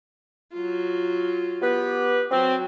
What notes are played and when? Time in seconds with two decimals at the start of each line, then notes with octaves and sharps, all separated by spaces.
0.53 F#3 F4
1.62 B3 G4 B4
2.31 F#3 C4